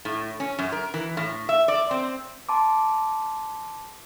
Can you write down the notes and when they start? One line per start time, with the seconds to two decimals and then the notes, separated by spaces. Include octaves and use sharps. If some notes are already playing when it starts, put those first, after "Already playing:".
0.05 A2
0.40 C#4
0.59 F#2
0.72 A#4
0.94 E3
1.17 A2
1.49 E5
1.68 D5
1.91 C4
2.49 A5 C6 D6